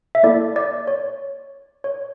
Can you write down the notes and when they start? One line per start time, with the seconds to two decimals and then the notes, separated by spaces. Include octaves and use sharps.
0.15 E5
0.23 A#3 E4 A4 D5
0.56 D5
0.87 C#5
1.84 C#5